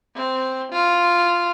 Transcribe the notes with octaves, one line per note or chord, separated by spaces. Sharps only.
C4
F4